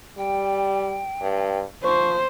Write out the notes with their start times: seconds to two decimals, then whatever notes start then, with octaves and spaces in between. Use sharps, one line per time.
0.18 G3 G5
1.21 G2
1.84 F3 C5 C#6